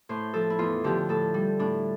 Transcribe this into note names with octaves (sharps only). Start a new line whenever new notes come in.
A2 C5
F3 A4
E4
E2 F4
D3 F3 G4
A2 A4
G3
A2 D4